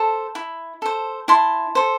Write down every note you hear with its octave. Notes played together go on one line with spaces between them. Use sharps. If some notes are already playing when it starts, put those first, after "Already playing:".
Already playing: A4 C5 A5
E4
A4 C5
E4 A5 C6
A4 C5